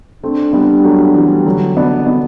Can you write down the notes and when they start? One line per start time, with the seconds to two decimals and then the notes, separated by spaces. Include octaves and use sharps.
0.23 A3 C4 D4
0.53 G3 B3
0.84 F#3 A3
1.15 E3 G3
1.45 D3 F#3
1.77 B3 D4
2.07 B3 D4